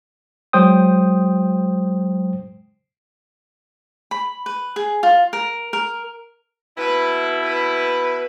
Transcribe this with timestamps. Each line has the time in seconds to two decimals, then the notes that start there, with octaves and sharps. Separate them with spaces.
0.53 F#3 G#3 C5 G5 D#6
4.11 B5
4.46 B4
4.76 G#4
5.03 F4
5.33 A#4
5.73 A#4
6.78 B2 E4 B4
7.43 B4